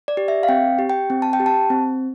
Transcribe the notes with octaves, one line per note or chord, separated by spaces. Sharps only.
D5
G4
E5
F5
C4 G5
G4
G5
C4
A5
G5
G4
A5
C4